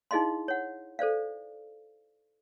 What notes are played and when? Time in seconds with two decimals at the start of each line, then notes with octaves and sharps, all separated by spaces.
0.11 D#4 E4 G#4 D#5 F5 C6
0.48 C#5 F#5
0.99 A4 C5 D5 F5